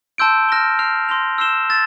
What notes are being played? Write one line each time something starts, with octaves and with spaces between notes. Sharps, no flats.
A5 C6 E6 G6 D7
F6 A#6 E7 G7
F6 C7 F7
C6 G6 A#6 F7
E6 G6 C7 E7 G7
E6 A6 E7